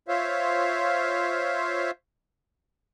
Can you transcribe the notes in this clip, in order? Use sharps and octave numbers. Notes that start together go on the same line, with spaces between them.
F4 C5 C#5 E5 F5